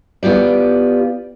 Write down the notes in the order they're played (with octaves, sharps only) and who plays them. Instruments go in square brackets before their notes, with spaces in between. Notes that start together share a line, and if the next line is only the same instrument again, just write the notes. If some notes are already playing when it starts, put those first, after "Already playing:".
[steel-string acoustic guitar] B3 F4 G4 D5